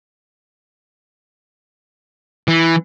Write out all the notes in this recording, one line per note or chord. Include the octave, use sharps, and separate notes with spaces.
E3